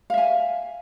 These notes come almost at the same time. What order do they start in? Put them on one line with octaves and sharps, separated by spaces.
F5 E5 G#5